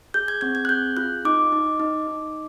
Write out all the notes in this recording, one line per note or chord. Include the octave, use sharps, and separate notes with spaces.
G#4 G6
G#6
C4 G#6
G#6
F#6
G#4 G6
F4 F#6
D#4 D6
D#4
D#4
D#4